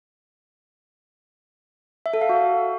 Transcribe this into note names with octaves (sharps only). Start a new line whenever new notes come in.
E5
A4
F5
F#4